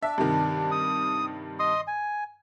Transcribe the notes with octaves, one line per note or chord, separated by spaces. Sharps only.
D4 E5
G2 C3 D#3
D#6
D#5 C6 D#6
G#5